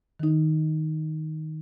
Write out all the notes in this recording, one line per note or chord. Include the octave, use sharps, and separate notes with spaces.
D#3 D#4